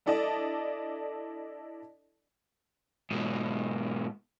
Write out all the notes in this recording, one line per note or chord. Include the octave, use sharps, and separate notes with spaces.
D4 E4 A4 D5 D#5 A5
G#2 B2